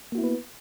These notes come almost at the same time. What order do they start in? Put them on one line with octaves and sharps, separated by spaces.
A#3 F#4 E4 B3 B4